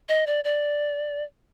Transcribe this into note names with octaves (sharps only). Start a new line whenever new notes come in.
D#5
D5
D5